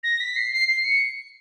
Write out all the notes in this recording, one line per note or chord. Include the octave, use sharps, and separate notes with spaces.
A#6
B6
C7
C7
C7
C#7